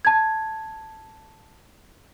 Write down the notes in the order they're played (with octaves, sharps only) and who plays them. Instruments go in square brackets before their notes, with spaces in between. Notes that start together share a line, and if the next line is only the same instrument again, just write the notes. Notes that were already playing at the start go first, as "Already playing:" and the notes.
[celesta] A5 G#6